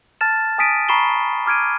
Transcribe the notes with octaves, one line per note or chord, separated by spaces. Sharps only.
A5 F6 A6 E7
G#5 D#6 A6 B6 D7 D#7
A#5 B5 C#6 C7 E7 G7
D6 F6 G#6 D7 D#7